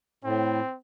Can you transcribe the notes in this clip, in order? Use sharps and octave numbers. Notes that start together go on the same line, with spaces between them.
A2 C4